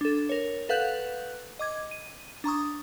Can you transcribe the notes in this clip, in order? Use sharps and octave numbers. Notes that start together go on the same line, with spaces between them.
D4 A4
A#4 C#5
A4 B4 F5 F#5 F#6 G6
D#5 D6 G#6
D#7
D4 A#5 C#6 D#6